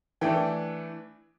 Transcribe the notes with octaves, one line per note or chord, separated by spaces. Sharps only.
E3 A3 D4 G5